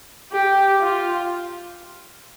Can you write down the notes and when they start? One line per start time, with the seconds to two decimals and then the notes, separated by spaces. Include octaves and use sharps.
0.32 G4
0.81 F4